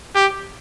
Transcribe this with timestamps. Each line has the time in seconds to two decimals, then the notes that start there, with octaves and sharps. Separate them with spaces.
0.15 G4